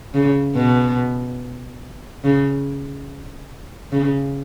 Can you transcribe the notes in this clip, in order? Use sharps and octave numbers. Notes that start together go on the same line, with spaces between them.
C#3
B2
C#3
C#3